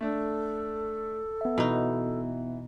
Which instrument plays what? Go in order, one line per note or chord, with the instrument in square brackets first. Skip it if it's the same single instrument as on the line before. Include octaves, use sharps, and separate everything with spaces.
[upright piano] A3 D4 [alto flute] A4
[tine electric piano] B3 E5
[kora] B2 D#4 [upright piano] E3